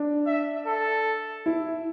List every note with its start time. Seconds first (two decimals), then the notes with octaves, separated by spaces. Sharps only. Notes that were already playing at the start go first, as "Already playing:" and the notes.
Already playing: D4
0.26 E5
0.67 A4
1.46 E4